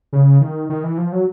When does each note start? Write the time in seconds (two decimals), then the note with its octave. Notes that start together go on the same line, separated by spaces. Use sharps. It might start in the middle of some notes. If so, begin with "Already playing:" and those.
0.13 C#3
0.41 D#3
0.69 D#3
0.84 E3
0.98 F3
1.12 F#3